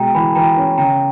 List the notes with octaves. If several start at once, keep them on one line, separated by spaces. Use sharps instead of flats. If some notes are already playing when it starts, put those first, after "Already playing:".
Already playing: B2 G#3 G5 A#5
E3 G#5 B5
E3 G5 A#5
C#4
C#3 G5 A#5